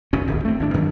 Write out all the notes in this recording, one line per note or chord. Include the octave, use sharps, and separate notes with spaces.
F#1 B2 C#4
D#1 G#1 D2
A3 C4
G#1 A2 D4
G2 D#3 E3 F#3